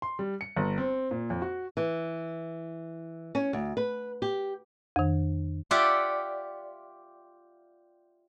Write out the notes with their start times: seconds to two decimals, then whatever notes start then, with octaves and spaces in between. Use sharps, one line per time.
0.02 C6
0.19 G3
0.41 C#7
0.56 G1
0.78 C4
1.11 A#2
1.30 F2
1.42 F#4
1.77 E3
3.35 C#4
3.53 D2
3.77 B4
4.22 G4
4.96 F2 D#3
5.71 F4 G4 D5 E5 F#5